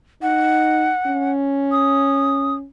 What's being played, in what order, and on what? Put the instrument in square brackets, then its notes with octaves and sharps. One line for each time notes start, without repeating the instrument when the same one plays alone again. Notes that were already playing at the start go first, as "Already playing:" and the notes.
[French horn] D#4 [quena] F#5
[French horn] C#4
[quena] D#6